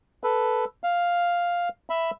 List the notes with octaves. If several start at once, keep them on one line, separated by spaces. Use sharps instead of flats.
A4 B4
F5
E5 B5